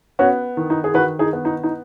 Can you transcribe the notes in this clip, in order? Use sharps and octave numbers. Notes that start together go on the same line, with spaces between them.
B3 C#4 F#4
D#3
D#4
G#4
D#3 F#4 B4
D#4 G#4
B3
D#4
D#4